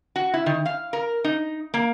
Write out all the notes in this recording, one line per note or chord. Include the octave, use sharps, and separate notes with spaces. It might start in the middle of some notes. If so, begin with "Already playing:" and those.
F#4
E4
D#3
F5
A#4
D#4
A#3